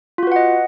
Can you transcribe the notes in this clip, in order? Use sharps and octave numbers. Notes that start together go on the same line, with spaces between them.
F4 F#4 B4 D#5 F#5